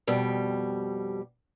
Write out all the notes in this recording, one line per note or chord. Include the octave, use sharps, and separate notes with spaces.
F2 B2 G3